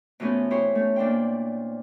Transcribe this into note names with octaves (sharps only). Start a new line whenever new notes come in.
B2 E3 F3 A3 B3 C#4
E4 G4 C5 C#5
A3 C#4
A#2 D4 C5 G5